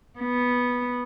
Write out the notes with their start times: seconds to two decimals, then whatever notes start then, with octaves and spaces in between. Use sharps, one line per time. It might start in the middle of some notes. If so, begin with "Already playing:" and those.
0.19 B3